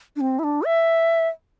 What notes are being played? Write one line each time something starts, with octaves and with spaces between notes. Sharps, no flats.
D4
C4
E4
D4
E5